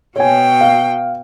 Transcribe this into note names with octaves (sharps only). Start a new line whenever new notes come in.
B2 C#5 G5 G#5
F5